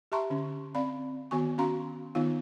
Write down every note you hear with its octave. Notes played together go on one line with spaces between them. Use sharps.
G4 E5 A5 A#5 C6 C#6
D3 C#4
C4 D5 F5 B5
D#3 B3 F#4 G#5 C#6
C#4 F#4 F5 A#5 C6
D#3 B3 D#4 F4 F5